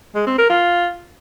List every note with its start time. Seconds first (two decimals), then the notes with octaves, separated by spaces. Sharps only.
0.15 G#3
0.26 C4
0.38 A#4
0.50 F4